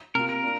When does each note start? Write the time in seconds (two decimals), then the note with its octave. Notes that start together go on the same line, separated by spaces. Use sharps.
0.15 C3 A#3 F4 A#4
0.29 A#4
0.43 A#3 D4 F4